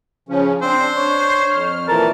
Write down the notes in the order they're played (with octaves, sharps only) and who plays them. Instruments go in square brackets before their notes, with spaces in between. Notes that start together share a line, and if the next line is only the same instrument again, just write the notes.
[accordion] C#3 F3 C#4
[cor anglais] C4 [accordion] D4 [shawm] C5
[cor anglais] C#5
[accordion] F2 F6
[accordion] A#2 E3 F3 [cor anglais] A#4 [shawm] A5